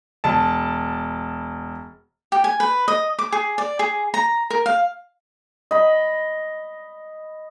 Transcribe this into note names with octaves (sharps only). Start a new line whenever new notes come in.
E1 A5
G4
G#5
B4
D#5
D6
G#4
D5
G#4
A#5
A#4
F5
D#5 B5